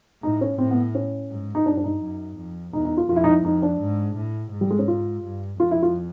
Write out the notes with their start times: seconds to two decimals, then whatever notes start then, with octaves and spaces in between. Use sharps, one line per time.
0.23 A2 D#4
0.41 C#4
0.58 A2 C4
0.71 B3
0.95 C#4
1.30 G#2
1.55 D#4
1.66 G2 D4
1.77 D4
1.84 D#4
2.01 F#2
2.37 F2
2.73 E2 D#4
2.85 D#4
2.97 F4
3.08 F2 F4
3.16 E4
3.24 D#4
3.31 E4
3.45 F2 D#4
3.62 D4
3.80 G#2
4.17 A2
4.52 G#2
4.61 G3
4.70 G#3
4.79 C#4
4.88 F4
5.24 G2
5.60 F2 F4
5.71 E4
5.82 F4